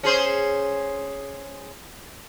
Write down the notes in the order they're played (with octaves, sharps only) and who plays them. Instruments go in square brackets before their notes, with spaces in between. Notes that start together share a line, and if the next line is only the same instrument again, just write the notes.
[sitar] C#4 G#4 C5